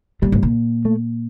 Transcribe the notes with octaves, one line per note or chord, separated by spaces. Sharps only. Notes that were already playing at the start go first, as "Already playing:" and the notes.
A#2 G3
A2
A#2
A3